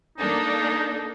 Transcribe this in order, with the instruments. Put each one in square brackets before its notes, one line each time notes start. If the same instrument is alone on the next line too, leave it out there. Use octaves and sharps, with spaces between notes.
[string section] A#3 D4 A4 [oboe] D#4